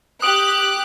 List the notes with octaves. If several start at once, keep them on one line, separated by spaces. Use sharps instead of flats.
G4 D#6 F#6 D7